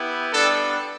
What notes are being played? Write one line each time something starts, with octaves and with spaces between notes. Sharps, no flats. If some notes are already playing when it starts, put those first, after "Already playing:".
Already playing: B3 E4 G4
G3 B3 D4 A4